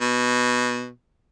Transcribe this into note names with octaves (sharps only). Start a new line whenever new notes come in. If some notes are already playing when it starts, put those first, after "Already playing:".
B2